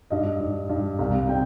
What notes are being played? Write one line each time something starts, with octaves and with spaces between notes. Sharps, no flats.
G2 D#5
G2
G2
C2 F5
C3 G5